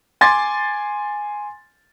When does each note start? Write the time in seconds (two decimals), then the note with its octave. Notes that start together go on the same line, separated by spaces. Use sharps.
0.21 G#5 C6 D6 A6